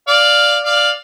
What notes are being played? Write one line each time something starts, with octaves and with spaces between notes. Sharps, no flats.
D5 F5
D5 F5